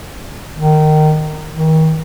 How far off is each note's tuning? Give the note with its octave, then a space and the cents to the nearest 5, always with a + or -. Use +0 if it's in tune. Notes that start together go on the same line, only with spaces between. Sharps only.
D#3 -20
D#3 +35